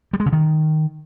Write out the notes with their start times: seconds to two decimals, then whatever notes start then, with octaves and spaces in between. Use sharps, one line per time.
0.13 G3
0.20 G#3
0.26 C#3
0.32 D#3